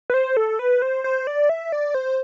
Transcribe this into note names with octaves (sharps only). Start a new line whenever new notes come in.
B4
C5
A4
B4
C5
C5
D5
E5
D5
C5